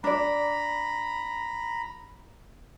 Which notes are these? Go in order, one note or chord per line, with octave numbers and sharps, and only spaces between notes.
D4 D5 A#5 B5